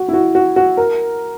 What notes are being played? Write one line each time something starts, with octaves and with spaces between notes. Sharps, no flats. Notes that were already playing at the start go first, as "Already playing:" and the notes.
Already playing: F#4
E4
F#4
F#4
F#4
A#4